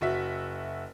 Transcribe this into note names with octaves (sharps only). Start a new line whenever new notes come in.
F#1 F#4 E5 B6